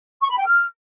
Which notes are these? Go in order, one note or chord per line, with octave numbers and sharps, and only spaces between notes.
C#6
B5
G5
F6